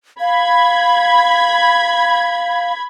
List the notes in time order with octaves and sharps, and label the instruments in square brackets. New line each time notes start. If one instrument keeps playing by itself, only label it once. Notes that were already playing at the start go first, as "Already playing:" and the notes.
[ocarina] F5 [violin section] B5 G#6